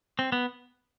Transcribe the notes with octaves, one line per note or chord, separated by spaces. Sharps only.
C4
B3